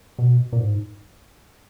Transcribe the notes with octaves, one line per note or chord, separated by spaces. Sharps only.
B2
A#2
G#2